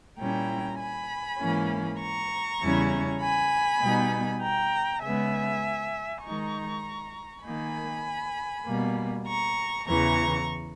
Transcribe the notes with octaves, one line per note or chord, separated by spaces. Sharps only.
A#2 G3 C#4 E4 G5 A#5
G#5 B5
G#2 E3 A#3 C#4
A#5 C#6
E2 C#3 G3 C#4 E4
G#5 B5
B2 G3 B3 D#4
G5 A#5
C#3 G#3 B3 E5 G#5
D#3 G#3 D#4 A#5 C#6
D#3 A#3 D#4 G#5 B5
B2 G3 A#3
A#5 C#6
E2 C#3 E3 A#5 C#6